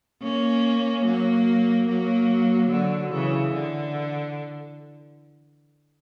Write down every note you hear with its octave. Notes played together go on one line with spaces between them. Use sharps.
A#3 C#4
F#3 A#3
F#3 A#3
D3 F#3
C#3 E3
D3